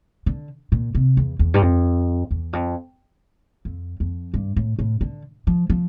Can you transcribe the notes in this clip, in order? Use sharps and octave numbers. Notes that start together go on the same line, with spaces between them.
D3
A#2
C3
E2
E2
G2
F2
E2
F2
F2
F2
G2
A2
A2
D3
F3
F3